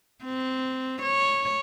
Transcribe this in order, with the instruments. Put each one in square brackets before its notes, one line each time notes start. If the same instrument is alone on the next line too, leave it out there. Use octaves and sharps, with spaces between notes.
[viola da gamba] C4
C#5